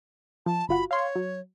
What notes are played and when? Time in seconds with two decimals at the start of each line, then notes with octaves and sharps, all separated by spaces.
0.46 F3 A5
0.69 G1 F4 F#4 B5
0.91 C#5 F5 C6
1.15 F#3